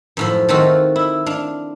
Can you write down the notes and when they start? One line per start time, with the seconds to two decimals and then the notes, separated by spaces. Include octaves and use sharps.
0.17 F#2 A2 F3
0.49 D#3 A3 C4 F4 F#4 F5
0.96 E4
1.26 D4 F5